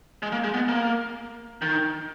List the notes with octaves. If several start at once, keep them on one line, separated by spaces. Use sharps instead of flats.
G#3
A#3
G#3
B3
A#3
D#3